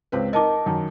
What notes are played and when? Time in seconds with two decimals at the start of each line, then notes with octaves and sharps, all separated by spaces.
0.12 C#2 C4 B4
0.33 D#4 A#4 D#5 A5 D6
0.66 F#2 D#3